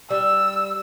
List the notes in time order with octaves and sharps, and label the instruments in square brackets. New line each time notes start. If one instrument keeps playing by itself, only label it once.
[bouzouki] G3 [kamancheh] E6